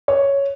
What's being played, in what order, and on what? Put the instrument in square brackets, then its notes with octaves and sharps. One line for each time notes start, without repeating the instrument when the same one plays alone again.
[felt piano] C#5